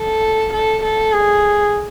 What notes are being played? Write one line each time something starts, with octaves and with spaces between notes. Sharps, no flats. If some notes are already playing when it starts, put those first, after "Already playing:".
Already playing: A4
A4
A4
G#4